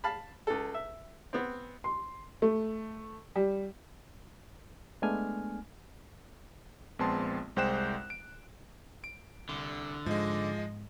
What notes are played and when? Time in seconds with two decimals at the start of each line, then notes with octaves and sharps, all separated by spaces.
0.04 F5 A5 B5
0.47 C#2 A4
0.74 E5
1.33 B3 C4
1.84 C6
2.42 A3
3.36 G3
5.02 G#3 A3 B3 D4 G#5 F6
6.99 A#1 G#3 B3 C4 A5 C6
7.56 C2 G#3 C5 G5 F#6 E7
8.10 D7
9.04 D7
9.49 C2 D3
10.06 G#2 F3 G#3 D#5